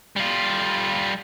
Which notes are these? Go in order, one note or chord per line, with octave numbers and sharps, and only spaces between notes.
G3 F4